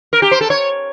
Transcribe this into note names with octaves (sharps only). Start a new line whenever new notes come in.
A#4
G4
C5
A4
C#5